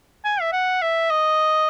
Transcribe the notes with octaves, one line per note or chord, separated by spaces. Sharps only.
G#5
E5
F#5
E5
D#5